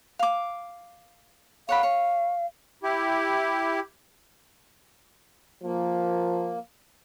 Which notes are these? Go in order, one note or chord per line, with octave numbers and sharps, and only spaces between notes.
F5 D6
C#5 F5 F#5 B5
C#5
E4 G4
F3 A#3